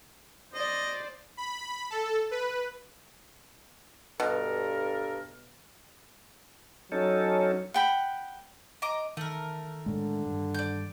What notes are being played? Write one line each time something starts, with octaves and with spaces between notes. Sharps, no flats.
C5 D5 D#5
B5
A4
B4
G2 B2 A4 A#4
F#3 C#4 D#4 A4
F#5 G5 B5
D#5 A#5 D6
D#3 A3 A#4
A2 D3 G#3
G2
D5 G6